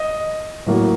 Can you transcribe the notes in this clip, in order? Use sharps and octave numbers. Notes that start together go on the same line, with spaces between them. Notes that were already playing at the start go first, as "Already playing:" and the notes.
Already playing: D#5
A2 F#3 A#3